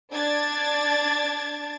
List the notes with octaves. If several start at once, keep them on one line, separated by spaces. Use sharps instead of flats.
D4 D5 G#6 A6